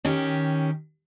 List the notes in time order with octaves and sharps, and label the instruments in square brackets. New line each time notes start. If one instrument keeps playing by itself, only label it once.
[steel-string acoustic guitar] D#3 C#4 G4